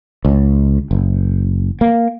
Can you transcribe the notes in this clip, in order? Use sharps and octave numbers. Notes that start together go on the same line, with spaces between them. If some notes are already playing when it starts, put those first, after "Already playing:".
C#2
F#1
A#3